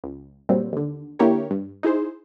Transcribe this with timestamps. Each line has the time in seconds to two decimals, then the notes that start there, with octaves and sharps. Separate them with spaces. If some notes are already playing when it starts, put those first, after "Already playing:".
0.04 C#2
0.49 G2 A#2 F#3 G3 C4
0.73 D#2 D3
1.19 D3 A#3 E4 G4 A#4 C#5
1.51 G2
1.83 D#4 E4 G#4 C5